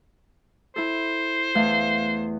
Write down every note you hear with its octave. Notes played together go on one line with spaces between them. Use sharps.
E4 A4 C5
E2 A3 F5